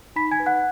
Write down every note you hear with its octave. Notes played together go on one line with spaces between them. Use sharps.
D#4 B5 B6
G#5 G#6
B4
F#5 F#6